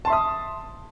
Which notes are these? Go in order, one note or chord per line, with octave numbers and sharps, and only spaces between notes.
E5 A5 C6 D#6